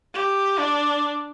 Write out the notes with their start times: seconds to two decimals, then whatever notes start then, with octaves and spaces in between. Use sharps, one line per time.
0.13 G4
0.58 D4